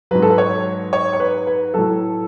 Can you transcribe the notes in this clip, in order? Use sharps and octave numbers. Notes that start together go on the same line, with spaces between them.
G#2 F#3 B4
A4
B4
C#5
C#5
C#5
B4
B4
A2 F#3 A4